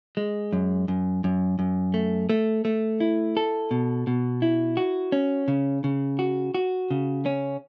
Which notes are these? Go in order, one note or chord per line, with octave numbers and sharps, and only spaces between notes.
G#3
F#2
F#2
F#2
F#2
A3
A3
A3
E4
A4
B2
B2
E4
F#4
C#4
C#3
C#3
F#4
F#4
C#3
C#4